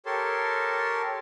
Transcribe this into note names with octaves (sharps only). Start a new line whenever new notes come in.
G4 A4 A#4 C#5 A5 C6